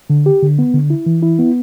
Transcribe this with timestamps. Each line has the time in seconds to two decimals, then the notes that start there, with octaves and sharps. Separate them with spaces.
0.10 D3
0.26 G4
0.42 D3
0.59 B3
0.74 D3
0.90 E4
1.06 E3
1.23 E4
1.39 B3